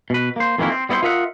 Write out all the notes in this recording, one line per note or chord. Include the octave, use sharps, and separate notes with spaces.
B2 B4
A#3 C5
F2 D#3 E3 G3 A#3 E4
C4
G3 B3 E4 A4 C5
F4 A#4 D#5 E5 F#5